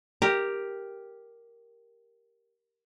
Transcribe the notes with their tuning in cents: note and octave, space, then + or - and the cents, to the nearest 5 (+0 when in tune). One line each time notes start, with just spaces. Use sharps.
G4 +0 A#4 +0